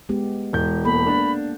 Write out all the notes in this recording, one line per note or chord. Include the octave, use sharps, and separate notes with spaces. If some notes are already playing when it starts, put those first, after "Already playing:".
G#3 B3 G4
E1 G6
A#3 B3 A4 B5
D4